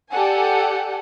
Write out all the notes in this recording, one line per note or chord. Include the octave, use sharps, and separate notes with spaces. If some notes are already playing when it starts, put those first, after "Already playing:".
G4 A4 D5 F#5 G#5